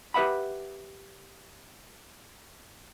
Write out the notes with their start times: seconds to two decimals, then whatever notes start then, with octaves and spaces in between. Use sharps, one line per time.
0.14 G4 B4 E5 F#5 B5